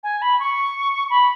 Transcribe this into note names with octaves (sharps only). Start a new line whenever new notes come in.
G#5
B5
C#6
B5